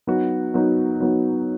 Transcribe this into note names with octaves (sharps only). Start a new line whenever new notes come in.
F#3 B3 D#4 F#4
F#3 B3 D#4 F#4
F#3 B3 D#4 F#4